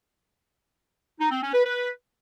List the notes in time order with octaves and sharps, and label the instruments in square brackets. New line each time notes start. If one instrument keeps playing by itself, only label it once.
[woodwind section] D#4
C4
C#4
B4
B4